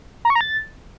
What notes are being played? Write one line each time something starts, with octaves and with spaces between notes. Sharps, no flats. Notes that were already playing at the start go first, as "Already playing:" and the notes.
A#5
C#6
A#5
A6